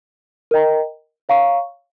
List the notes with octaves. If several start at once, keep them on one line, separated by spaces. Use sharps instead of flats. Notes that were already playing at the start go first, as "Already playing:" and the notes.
A#4 D#5 G5 A#5
C#5 F5 A#5 C#6